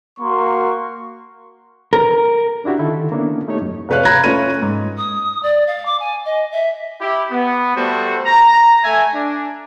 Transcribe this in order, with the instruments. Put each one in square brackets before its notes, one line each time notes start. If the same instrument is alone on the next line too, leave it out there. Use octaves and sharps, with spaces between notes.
[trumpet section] A#3 F#4 A#4 C6 C#6
[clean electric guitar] A#4
[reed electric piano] C#4 D4 E4 F#4 G4
D3 D#3 E4 F4 A4
A#3 B3 C#4 D4 E4
A3 D#4 G4 C#5
F#2
[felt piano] F1 C3 B4 C#5 F5 F#6
A#5 B5 F#6 G#6 A#6
A3 C#4 F4 B4 C#5 D#7
G#2
[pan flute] D#6
D5
F5
D6
G#5
D#5
E5
[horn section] E4 G4
B3
G3 A3 F#4 A4 C5
A#5
A3 E5 G#5
D4